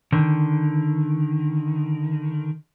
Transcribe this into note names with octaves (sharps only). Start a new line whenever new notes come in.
D3 D#3